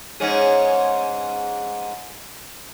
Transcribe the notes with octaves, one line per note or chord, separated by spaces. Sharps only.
G#2 C#4 G#4